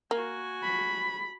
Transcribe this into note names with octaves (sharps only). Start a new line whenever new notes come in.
A#3 F#4 G#5
B5